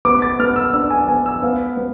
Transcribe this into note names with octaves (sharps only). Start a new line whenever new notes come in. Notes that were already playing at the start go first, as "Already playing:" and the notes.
B3 D6
A6
B3 F6
E6
D4 E6
G#5
B3 G#5
E6
B3 F5
B3